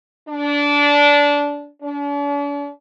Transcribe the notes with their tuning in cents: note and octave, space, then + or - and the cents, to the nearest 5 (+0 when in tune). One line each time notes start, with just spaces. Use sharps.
D4 -20
D4 -45